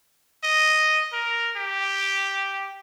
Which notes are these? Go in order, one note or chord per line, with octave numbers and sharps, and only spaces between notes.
D#5
A#4
G4